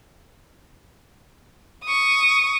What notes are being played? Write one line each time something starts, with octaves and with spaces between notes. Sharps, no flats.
C#6 D#6